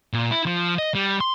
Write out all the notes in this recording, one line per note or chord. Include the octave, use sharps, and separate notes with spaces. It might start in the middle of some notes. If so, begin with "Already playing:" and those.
A#2
E4
F3
D#5
G3
C6